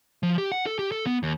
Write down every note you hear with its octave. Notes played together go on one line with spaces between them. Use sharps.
F3
G4
F#5
A4
G4
A4
B3
D#2